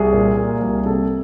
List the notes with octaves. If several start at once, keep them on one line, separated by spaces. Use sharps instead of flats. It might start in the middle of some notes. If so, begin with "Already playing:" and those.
Already playing: C2 G#4
A#2
A#3
C2
C3 A4